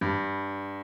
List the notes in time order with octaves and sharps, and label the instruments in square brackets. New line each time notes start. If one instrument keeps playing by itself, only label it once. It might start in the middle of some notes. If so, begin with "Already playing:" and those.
[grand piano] G2